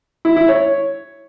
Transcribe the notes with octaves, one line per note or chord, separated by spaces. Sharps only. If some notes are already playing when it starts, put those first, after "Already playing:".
E4
E4
C#5